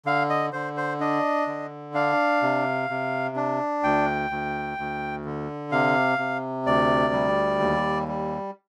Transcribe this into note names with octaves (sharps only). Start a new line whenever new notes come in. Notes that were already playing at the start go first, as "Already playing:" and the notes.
D3 F5
D#5
D3 C5
C5
D4 D#5
D3
D4 F5
C3
C3
D4
D2 G5
D2
D2
D3
C3 F5
C3
D2 D5
G3
D#2
G3